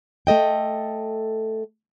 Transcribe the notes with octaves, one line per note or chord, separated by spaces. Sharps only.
A3 A4 D#5 G5